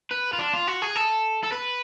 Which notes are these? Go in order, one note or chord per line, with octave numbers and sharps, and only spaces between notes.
B4
F4
D4
F4
F#4
G#4
A4
A4
B4